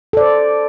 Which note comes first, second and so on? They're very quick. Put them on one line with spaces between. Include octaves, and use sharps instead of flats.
A4 D5 C5